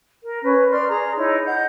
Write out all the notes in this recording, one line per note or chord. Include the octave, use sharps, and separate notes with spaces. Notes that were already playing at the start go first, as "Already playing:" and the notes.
A#4
C#4 B4
D5 C6 F6
G#4 A#5
D#4 E4 C#5
D#5 F#5 G6